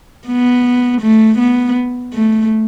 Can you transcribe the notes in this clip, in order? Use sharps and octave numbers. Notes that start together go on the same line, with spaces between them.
B3
A3
B3
A3